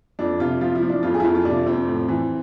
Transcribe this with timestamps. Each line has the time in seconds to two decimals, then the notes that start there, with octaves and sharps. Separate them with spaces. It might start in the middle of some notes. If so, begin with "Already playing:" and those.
0.19 F2 D4
0.40 C3 F4
0.61 F3 F4
0.75 E4
0.83 F3
0.89 D4
1.03 F2 F4
1.14 G#4
1.20 E4
1.24 F2 F4
1.35 F4
1.45 C3 D4
1.66 F2 C4
1.87 A2
2.08 E3